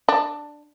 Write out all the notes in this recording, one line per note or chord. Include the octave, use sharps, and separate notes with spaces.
D4